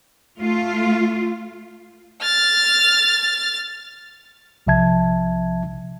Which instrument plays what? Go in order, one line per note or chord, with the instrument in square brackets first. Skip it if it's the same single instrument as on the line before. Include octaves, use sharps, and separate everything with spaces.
[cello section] A3 F4
[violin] F6 A6
[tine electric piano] B1 C3 F3 E5 A5 G#6